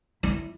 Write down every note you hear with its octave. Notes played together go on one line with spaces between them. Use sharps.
E4